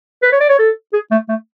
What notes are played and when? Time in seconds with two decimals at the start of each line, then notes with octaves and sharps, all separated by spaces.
0.22 B4
0.32 C#5
0.41 D5
0.49 C#5
0.59 A4
0.93 G#4
1.11 A3
1.29 A3